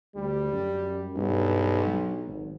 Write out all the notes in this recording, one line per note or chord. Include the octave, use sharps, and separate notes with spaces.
D2 G3
F#2
B1 G2
F#3
G#1